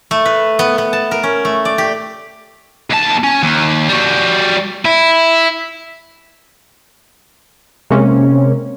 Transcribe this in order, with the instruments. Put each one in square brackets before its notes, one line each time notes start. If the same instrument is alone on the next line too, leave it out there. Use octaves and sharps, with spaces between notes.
[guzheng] A3
B4
B3
B3
A5
A#4
C#4
A3
D5
G4
[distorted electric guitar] D#2 A5
C#4
D#2
G3 F#4
E4
[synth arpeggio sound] C3 G#3 A#3 C4 C#4